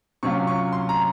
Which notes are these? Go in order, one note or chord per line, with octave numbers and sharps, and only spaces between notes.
C3 F#3 C#4 F4 C#6
C#6
C6
A#5